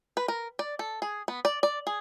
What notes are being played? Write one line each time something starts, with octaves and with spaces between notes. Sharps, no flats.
B4
A#4
D5
A4
G#4
B3
D5
D5
G#4